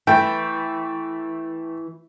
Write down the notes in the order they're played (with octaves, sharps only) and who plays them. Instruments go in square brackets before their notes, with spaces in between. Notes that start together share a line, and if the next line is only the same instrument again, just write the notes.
[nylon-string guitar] E3 [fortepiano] A3 G5